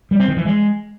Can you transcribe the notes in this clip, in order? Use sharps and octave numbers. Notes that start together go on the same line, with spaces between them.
G3
C4
D#3
E3
G#3